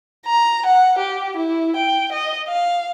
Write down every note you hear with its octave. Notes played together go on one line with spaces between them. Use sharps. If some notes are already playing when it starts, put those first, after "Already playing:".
A#5
F#5
G4
E4
G5
D#5
F5